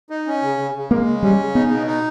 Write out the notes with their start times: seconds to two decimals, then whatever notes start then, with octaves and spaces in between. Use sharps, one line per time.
0.10 D#4
0.27 C#4
0.42 C#3
0.58 C#3
0.75 C#3
0.91 G#3 A#3
1.06 C#3
1.23 G3 C#4
1.39 C#3
1.55 B3 D#4
1.71 B2
1.87 D#4